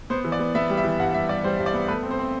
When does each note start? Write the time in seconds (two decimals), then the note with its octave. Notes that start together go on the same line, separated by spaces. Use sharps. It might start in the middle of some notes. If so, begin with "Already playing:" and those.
0.10 B3 C5
0.24 E3
0.32 D5
0.39 B3
0.55 B3 E5
0.70 G3
0.77 E5
0.84 E3
0.99 G2 F#5
1.14 G2 E5
1.29 G2 D5
1.44 G3 C5
1.59 G2
1.66 D5
1.74 B3
1.88 A3 B4
2.03 C4
2.11 C5
2.19 C4